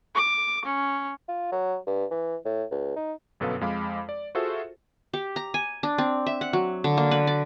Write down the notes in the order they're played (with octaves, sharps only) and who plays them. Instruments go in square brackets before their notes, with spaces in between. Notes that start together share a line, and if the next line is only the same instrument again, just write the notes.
[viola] D6
C#4
[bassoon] F4
F#3
G2
E3
A2
C#2
D#4
[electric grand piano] G1 F#2 B2 A4 B4 F5
F2 G#3 F5 B5 D6
D5
F4 F#4 G#4 A4 C5 E5
[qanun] G4
A#5
G#5
D4
C4
E5
F#5
F#3
D3
A#3
B4
D5